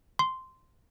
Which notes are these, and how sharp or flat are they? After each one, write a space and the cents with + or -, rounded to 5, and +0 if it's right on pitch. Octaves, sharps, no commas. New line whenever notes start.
C6 -5